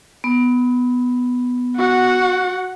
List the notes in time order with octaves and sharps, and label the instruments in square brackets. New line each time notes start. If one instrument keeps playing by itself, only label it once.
[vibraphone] B3
[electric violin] F#4 F#5